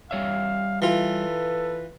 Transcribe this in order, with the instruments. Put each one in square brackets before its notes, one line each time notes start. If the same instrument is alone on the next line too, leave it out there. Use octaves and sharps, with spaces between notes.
[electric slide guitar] G3 C#5 E5 [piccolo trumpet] F5
[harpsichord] E3 F4 [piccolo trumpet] A4 [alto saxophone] B4